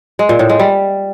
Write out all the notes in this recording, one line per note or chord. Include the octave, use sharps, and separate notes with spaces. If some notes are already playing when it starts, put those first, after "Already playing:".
G#3
A#2
A2
G#3
G3